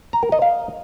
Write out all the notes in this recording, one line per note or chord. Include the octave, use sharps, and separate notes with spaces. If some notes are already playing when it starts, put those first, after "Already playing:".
A#5
A#4
D#5
F5